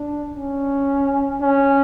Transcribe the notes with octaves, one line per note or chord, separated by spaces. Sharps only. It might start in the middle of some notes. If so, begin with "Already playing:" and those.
Already playing: D4
C#4
C#4